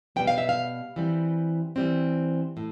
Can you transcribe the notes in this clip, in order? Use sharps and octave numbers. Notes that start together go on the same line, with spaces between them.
B2 G3 B3 G5
F5
E5
F5
E3 G3 C4
E3 G3 C4
A2